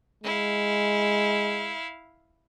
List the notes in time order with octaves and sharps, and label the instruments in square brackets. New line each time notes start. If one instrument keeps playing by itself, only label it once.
[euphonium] G#3 [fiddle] E4 F5